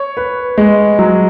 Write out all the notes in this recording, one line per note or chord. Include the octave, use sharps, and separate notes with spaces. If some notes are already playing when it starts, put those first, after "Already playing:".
Already playing: C#5
B4
G#3
F#3